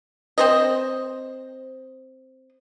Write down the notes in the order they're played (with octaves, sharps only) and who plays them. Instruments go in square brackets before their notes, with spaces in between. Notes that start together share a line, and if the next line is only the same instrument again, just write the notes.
[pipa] C4 C5 D#5